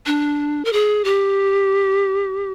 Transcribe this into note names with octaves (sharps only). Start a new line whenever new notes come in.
D4
A#4
G#4
G4